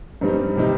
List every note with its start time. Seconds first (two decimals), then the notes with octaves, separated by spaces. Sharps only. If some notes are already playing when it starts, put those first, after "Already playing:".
0.21 G2 G3 C4 D#4
0.57 C3 D#3 G3 D#4